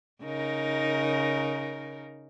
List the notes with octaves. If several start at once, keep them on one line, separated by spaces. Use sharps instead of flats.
C#3 D#4 A#4